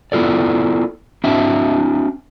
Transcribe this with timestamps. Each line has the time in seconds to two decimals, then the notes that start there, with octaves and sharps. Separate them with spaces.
0.12 B3 E4 F4 A4 D5
1.24 C4 D4 E4 F#4 E5